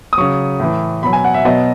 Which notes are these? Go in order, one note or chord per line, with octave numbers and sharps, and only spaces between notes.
D#6
C#3 F#3 C#6
A2 E3
B2 F#3 B5
G#5
F#5
E5
B2 F#3 D#5